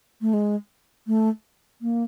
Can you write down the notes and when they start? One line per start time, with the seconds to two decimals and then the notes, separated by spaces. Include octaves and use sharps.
0.21 A3
0.34 G#3
1.07 A3
1.81 A#3